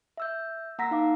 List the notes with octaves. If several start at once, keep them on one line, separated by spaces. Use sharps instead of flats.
E5 E6 G6
A#3 F#5 A#5 E6 A#6 B6
D#4 F5 D6